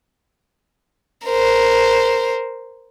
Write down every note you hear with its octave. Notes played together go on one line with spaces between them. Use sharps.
A#4 C5